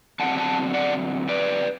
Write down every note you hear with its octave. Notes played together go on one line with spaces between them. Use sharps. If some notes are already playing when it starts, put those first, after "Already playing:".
E2 D3 F#3 C4 F#5 A5
F#5 A5
D5 F#5
B4 D5